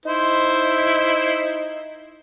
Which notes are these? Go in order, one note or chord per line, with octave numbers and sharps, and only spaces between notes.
D#4 E4 C5